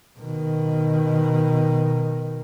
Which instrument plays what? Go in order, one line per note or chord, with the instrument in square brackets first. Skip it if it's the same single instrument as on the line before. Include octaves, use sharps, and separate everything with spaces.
[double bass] B2 D#3